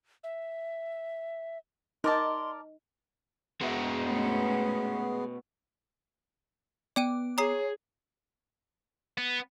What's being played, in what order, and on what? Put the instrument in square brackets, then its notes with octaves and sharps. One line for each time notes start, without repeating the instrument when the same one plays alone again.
[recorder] E5
[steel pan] D#4 [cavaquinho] A#4 D5 A5 [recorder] C6
[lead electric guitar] B2 E5 [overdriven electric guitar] G#3 F#4
[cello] A3 C#4 [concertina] B3
[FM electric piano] B3 D6 [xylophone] D5 G5 D#7
[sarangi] G#4 [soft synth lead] C#5 [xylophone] A#5 D#6 C7
[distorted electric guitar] B3